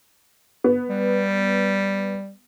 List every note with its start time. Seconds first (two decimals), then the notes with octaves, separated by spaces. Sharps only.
0.64 B3
0.90 G3